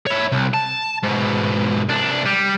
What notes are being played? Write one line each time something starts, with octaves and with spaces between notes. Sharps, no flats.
E4 C#5
C2
A5
G#2 B2
C2 D4
G3